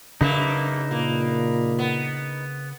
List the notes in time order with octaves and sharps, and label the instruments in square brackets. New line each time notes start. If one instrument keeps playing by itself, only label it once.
[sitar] F#2 A#3 [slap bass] C#3 D4 [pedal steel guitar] D#4 B4 E5
[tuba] A#2 [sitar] A#3
[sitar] B3